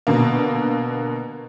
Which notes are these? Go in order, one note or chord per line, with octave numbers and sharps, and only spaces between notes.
B2 D3 A#3